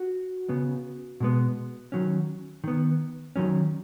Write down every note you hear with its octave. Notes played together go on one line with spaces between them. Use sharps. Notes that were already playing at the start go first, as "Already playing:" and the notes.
Already playing: F#4
C#3 B3
B2 G#3 B3
D#3 F#3 C#4
D#3 B3
D#3 F#3 C#4